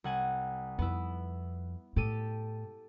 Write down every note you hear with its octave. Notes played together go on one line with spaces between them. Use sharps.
C2 F#5 G#5
F2 B3 E4
A2 G4 A4 D#7